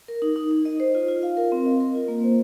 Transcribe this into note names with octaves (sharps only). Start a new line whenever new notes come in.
A#4
D#4
D#4
D#4
D#5
C5
F4
F4
F5
A#4
C4
D#5
A#4
F4
A#3
C5